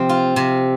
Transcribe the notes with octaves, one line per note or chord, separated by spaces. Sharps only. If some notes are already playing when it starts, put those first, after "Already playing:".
Already playing: C3 F3 C4
F4
C3